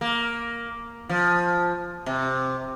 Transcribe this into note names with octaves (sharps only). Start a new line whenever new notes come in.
A#3
F3
C3